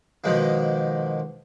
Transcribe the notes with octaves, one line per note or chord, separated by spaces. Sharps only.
B2 D#3 F3 G#3 A#3